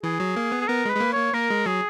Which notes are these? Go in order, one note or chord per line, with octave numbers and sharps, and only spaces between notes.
E3 G#4
F#3
A#3
B3
G#4
B3 A#4
G#3
B4
G#3
A#3
A#3 C#5
A#3 A#4
G#3
F#3 G#4